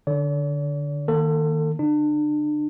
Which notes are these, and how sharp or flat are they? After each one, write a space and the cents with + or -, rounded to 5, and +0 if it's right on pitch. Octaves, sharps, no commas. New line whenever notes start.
D3 +0 D5 -45
D#3 +0 A#3 +0 A4 +30
D3 -40 D4 +35